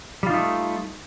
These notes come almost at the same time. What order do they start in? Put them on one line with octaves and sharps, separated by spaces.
G3 F4 D#4 A3